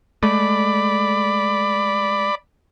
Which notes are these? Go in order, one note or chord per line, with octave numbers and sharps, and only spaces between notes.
G#3 A3 D5 B5